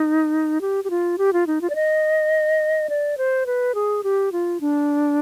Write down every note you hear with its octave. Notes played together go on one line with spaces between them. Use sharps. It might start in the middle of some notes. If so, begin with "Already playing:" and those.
Already playing: D#4
G4
G4
F4
G4
F4
D#4
F4
D5
D#5
D5
C5
B4
G#4
G4
F4
D4